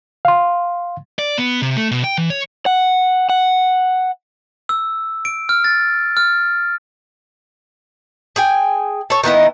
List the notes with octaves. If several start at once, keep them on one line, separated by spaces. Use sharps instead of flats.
F5 C6
D5
B3
C3
A3
B2
G5
E3
C#5
F#5
F#5
E6
D7
F6
A6
F6
G#4 G5 G#5
A4 C#5
D#3 B3 E4 D#5